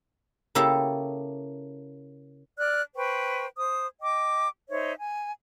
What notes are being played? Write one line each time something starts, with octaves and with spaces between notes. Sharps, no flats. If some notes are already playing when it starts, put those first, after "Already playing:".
C#3 A#3 E4 G4 A4 E5
D5 F6 F#6
B4 C5 G5 C#6
C5 D#6
D#5 G5 D6
D#4 C5 C#5 E5
G#5